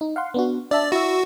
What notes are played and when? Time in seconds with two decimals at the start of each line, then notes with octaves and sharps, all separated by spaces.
0.01 D#4
0.16 F5 F#5 C6
0.34 B3 D4 F#4
0.71 D4 D5 E5 A5
0.92 E4 F#4 E5